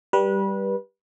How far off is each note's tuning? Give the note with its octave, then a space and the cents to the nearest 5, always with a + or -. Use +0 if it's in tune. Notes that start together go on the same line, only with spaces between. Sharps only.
G3 +0 B4 -25